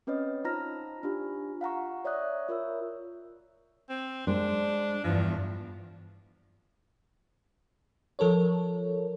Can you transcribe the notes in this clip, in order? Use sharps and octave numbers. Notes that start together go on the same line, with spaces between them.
C4 C#4 B4 C#5 D#5
D#4 F4 C5 A#5 F6 A#6
D4 F4 G4
F5 F#5 A#5 C#6
C#5 D5 E5 C#6 D#6 F#6
F4 A#4 C#5 E5 C#6 E6
C4
G#3 D4 C5
E2 G2 F3
F3 A4 A#4 C#5